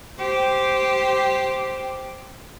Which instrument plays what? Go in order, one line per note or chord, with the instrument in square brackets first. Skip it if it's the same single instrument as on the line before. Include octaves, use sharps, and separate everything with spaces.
[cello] G4 C5